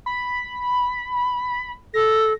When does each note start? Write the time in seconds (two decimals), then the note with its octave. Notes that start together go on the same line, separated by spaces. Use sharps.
0.06 B5
1.94 A4 A#6